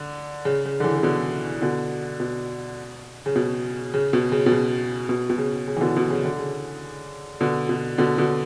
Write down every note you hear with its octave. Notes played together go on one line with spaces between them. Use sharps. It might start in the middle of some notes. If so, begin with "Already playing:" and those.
Already playing: D3
C#3
C#3
D3
C#3 E3
C#3
B2 D3
B2 D3
B2
C#3
B2
C#3
B2
C#3
B2
C#3
B2
B2
C#3
C#3
E3
B2 D3
B2
C#3
D3
C#3
B2 D3
B2
B2 D3
B2 D3